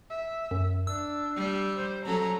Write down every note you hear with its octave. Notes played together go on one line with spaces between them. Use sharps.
E5
F#2
D4 E6
G3
C5
F#3 C#4 A4 A#5